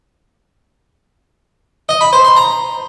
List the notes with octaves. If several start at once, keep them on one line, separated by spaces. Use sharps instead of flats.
D#5
B5
C5
C6
A#5